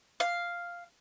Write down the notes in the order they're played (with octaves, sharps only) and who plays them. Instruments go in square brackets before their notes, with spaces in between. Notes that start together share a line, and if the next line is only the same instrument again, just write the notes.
[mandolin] F5